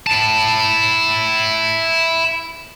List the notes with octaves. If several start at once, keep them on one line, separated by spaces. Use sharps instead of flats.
E4 A5